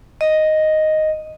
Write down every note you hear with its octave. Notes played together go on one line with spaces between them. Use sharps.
D#5